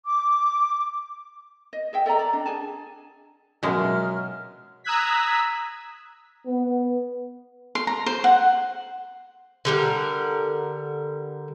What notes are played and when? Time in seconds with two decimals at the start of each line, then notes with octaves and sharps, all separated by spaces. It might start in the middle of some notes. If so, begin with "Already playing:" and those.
0.06 D6
1.73 D#5
1.93 G#4 E5 G5
2.06 A4 D5 D#5 A#5
2.19 D5
2.33 D4
2.46 G#4 G#5 A5
3.63 B2 F#3 G#3 C#4 F4 A#4 E5 F6
4.84 A#5 D#6 E6 F#6 G#6 B6
6.46 B3
7.75 C6
7.87 A#5
8.06 C5
8.24 F#5
9.65 D3 G3 A#4